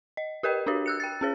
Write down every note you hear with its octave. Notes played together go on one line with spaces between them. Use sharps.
D#5
G4 A#4 B4 D#5 G5
D4 F#4 G4 C#5
E6 F#6 C#7
G5 A6
C#4 G#4 C#5